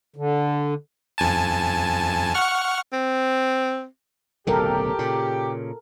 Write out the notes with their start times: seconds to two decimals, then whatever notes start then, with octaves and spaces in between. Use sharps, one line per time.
0.16 D3
1.18 F2 G#5 A5
2.34 F#5 C#6 F6
2.93 C4
4.47 D1 B1 C#3 G4 A4 A#4
4.99 A#2 C#3